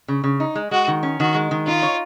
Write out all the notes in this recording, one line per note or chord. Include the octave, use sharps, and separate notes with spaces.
C#3
C#3
D#4
G#3
G#3 F#4
D#3
C#4
D#3 F#4
G#3
D#3
D#4 F4
C#5